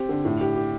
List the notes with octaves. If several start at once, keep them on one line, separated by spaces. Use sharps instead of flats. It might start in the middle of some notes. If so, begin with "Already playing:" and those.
Already playing: C4 G4
D3
A2
G4
G4